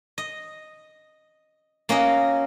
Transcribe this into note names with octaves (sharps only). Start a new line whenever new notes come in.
D#5
A#3 C#4 F#4 D#5